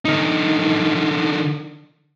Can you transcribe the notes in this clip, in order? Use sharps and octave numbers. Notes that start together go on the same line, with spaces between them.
D3 D#4